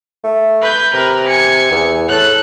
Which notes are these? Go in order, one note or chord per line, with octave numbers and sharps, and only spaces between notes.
A3
B4 G6
C3 A#4 B4
G#5 C#7
E2
A2 A4 F#6